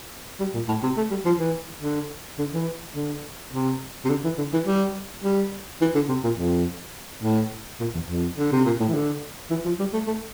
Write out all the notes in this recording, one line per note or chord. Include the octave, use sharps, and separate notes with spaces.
G3
A#2
A2
C3
A3
G3
F3
E3
D3
D3
E3
D3
C3
C3
D3
E3
D3
E3
G3
G3
E3
D3
C3
A#2
F2
A2
A#2
E2
F2
D3
C3
A#2
A2
E3
D3
E3
F3
G3
A3
A3